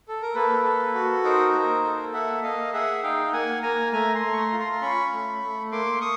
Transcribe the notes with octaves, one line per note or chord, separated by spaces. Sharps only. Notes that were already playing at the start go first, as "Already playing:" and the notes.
A4
A#4
A#3 A4 B4
A4
F#4
D#4 A#4 C5
A#3
A4
A#3 E5 F#5
A#3 D#5 F5
G#4 E5 F#5
D#4 F5 G5
A#3 F#5 G#5
A#3 G#5 A#5
A3 G#5 A#5
A#5 C6
A3
C#6
A#5 C6
F4
A#5 C6
C6
C#4 B5 C#6
A3
A3
A#3 C6 D6
C#6 D#6